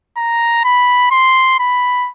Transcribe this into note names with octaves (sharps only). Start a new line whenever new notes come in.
A#5
B5
C6
B5